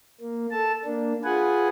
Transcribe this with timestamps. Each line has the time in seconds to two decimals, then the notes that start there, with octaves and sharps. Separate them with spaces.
0.21 A#3
0.51 A4 A5
0.85 A#3 D4
1.24 F4 G#4 B4 F#5 G#5